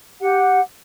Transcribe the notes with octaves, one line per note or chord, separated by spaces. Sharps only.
G4 F#5